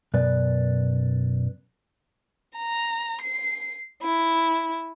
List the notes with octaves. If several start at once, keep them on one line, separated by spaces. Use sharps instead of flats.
F#2 B2 B4 D5
A#5
C7
E4